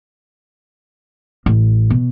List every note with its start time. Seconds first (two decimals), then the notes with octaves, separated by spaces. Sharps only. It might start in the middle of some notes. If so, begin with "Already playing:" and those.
1.46 A1
1.90 B2